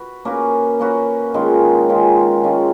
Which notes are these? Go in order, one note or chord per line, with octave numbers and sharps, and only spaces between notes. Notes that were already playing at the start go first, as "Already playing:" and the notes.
Already playing: F#4 B4
A#3 C#4 F#4 B4
A#3 C#4 F#4 B4
D#3 G#3 C#4 F4
D#3 G#3 C#4 F4
D#3 G#3 C#4 F4